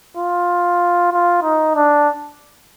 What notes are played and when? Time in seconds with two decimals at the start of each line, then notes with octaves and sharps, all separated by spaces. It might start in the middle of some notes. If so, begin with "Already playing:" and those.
0.17 F4
1.13 F4
1.43 D#4
1.76 D4